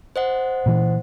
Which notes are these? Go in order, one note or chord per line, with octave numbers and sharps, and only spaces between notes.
C5 D#5 F#5
A#2 E3